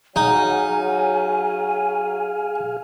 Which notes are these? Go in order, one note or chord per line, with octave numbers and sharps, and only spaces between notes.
F#3 D#4 G#4 F5 G#5